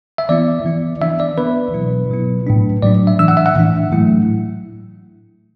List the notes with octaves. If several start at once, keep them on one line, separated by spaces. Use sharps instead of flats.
E5
E3 B3 E4 D5
E3 B3 E4
E3 B3 D4 E5
D5
E3 B3 D4 B4
B2 F#3 B3 E4
B2 F#3 B3 E4
A2 F#3 D4
A2 F#3 D4 D5
E5
A2 E3 D4 E6
F#5
E5
F#5
A2 E3 D4
A2 F#3 A3 E4